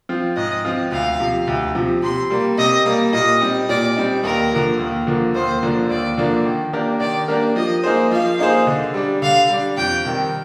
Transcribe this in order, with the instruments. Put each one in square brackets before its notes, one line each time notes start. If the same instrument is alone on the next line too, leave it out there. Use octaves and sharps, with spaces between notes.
[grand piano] F3 C4 F4
[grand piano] G#2 [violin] D#5
[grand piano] F3 C4 F4
[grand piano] D2 [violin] F5
[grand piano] C3 F3
D2
C3 F3
[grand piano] C3 [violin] C6
[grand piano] G3 A#3
[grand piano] C3 [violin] D#5
[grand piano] G3 A#3
[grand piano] A#2 [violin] D#5
[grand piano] G3 C4 D#4
[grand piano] A#2 [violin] D5
[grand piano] G3 C4 D#4
[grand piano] D#2 [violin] A#4
[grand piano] D3 F3 A#3
D#2
D3 F3 A#3
[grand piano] D#2 [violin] C5
[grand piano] D3 F3 A#3 D4
[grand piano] D#2 [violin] D5
[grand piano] D3 F3 A#3 D4
D#3
A#3 D4 G4 A#4
[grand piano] D#3 [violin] D5
[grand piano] A#3 D4 G4 A#4
[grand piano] F3 [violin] D#5
[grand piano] A#3 D#4 G#4 C5
[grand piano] F3 [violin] F5
[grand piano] A#3 D#4 G#4 C5
D3
G3 D4
[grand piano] D3 [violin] F5
[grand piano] G3 D4
[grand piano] F2 [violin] G5
[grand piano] C3 D#3 G3